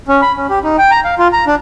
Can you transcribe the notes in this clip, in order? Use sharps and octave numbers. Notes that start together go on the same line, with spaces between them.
C#4
B5
C#4
G4
D#4
G5
A#5
F5
F4
A#5
D4